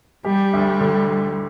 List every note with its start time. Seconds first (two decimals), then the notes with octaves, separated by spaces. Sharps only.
0.25 G3 G4
0.53 D2
0.81 D3